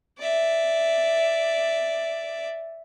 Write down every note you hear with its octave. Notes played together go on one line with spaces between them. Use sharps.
D5 E5